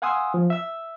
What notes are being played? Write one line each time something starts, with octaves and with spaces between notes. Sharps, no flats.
F5 F#5 G#5 C6 D#6 E6
F3
E5 E6